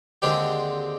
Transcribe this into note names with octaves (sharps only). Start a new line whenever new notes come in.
D#2 D3 G#3 C4 D4 G4